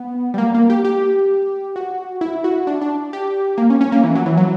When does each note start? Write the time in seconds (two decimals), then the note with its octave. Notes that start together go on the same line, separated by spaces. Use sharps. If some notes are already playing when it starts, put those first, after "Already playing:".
Already playing: B3
0.34 G3
0.38 A#3
0.55 A#3
0.70 G4
0.85 G4
1.76 F#4
2.21 E4
2.44 F#4
2.67 D4
2.82 D4
3.13 G4
3.58 A#3
3.70 C#4
3.81 C#4
3.92 A#3
4.04 E3
4.15 F#3
4.26 E3
4.38 F#3